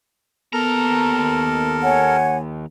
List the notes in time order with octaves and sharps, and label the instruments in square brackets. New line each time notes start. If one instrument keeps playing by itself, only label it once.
[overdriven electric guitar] D#2 A#5 [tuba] B3 [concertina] A4 A#4
[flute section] C#5 F#5 G#5